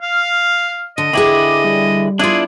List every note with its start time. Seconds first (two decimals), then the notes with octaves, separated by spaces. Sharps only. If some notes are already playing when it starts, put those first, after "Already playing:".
0.02 F5 F6
0.98 D3 D#5
1.13 D3 E4 G#4 B4 G5 D6
1.65 G3
2.19 B3 D4 E4 F4 G#4 D5